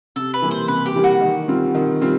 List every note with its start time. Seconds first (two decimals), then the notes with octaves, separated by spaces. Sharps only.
0.16 C3 A4
0.34 B4
0.42 E3 G3 A#3
0.51 C5
0.68 C3 B4
0.86 G4
0.96 E3 G3 A#3
1.04 F#4
1.21 D#3
1.48 G3 C4 F4
1.75 D#3
2.01 G3 C4 F4